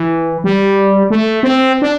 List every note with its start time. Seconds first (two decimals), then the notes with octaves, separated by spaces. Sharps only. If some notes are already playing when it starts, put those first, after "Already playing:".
Already playing: E3
0.44 G3
1.10 A3
1.43 C4
1.82 D4